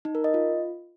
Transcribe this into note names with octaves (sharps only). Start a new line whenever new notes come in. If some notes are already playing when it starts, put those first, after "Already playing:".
D#4
A#4
D#5
F4